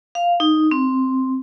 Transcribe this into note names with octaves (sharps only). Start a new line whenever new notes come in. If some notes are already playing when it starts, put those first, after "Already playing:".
F5
D#4
C4